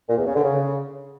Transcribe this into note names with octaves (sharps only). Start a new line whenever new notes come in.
A#2
E2
C#3
D3
C#3